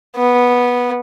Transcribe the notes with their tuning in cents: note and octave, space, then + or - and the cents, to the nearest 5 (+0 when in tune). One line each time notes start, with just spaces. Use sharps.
B3 -10